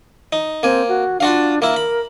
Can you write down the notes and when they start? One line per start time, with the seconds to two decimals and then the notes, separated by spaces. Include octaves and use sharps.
0.33 D#4
0.63 A#3 C4 G#5
0.88 F#4
1.20 D4 F4 F#4 F5
1.62 A#3 E4 A#4
1.76 B5